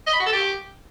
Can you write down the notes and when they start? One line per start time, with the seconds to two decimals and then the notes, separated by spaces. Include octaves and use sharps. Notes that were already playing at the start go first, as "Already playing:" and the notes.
0.07 D#5
0.13 B5
0.20 F#4
0.26 A4
0.33 G4